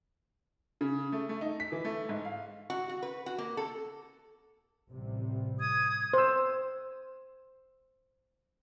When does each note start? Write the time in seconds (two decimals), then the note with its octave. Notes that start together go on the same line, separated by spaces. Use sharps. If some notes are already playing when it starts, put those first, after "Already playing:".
0.81 C#3
1.12 A3
1.29 A3
1.41 D#4
1.60 B6
1.72 E3
1.85 A3
2.09 G#2
2.25 F5
2.70 F#4
2.89 F#4
3.03 B4
3.26 F#4
3.38 A#3
3.57 A4
4.89 A1 C3 G3
5.59 D#6 G#6
6.13 C5 E6